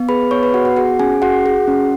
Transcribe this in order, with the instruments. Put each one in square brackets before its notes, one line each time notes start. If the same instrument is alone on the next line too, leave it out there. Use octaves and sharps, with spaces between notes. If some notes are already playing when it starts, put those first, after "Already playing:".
Already playing: [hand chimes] B3
G#4 B4 B5
B3 C#5 C#6
B4 B5
B3 F#4 F#5
F#4 F#5
F#4 G#4 F#5
C#4 G#4 G#5
F#4 G#4 F#5
G#4
C#4